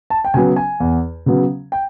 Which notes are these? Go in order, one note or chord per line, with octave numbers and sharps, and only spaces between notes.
A5
G5
C#3 F#3 B3 G#5
G#5
E2
C#3 F#3 B3
G5